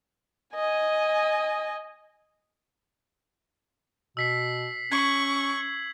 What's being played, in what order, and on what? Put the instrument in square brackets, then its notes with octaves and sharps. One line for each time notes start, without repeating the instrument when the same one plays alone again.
[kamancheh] D#5 G#5
[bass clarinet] B2 [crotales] E6 B6 C7
[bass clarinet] C#4 [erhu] C#6 [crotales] G#6 F#7